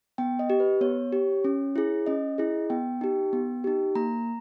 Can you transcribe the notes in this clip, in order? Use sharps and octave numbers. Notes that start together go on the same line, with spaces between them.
B3 G5
D#5
G4
B4
B3 C#5
G4
C#4
E4 G#4
C#4 D#5
E4 G#4
B3 G5
D#4 G4
B3
D#4 G4
A#3 A#5